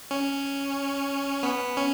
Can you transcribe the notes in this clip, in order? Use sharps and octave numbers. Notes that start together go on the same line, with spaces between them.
C#4
B3
C#4